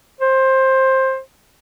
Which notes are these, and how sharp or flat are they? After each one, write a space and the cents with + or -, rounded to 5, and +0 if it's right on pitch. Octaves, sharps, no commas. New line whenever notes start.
C5 +15